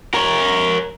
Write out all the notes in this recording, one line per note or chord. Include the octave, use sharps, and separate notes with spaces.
A#4 C#5